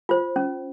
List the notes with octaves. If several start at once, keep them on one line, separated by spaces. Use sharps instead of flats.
F4 C5
C#4